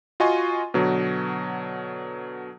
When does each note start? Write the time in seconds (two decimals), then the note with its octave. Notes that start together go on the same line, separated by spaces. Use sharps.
0.20 F4 F#4 D#5 G#5 C6 C#6
0.74 B2 D3 F#3 B4